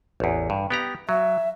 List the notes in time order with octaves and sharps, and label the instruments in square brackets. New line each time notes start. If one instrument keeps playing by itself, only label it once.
[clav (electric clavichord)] A1 E2
G2
B3 G4 A#5
[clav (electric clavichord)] F#3 [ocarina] E5